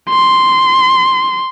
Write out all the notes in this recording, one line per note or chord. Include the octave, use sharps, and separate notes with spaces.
C6